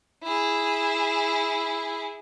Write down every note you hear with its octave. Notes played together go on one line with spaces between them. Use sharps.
E4 G#4